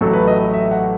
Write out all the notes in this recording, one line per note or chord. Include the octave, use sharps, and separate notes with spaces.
A1 A2 F#3 A3 A4
B4
D#5
D#5
E5
F#5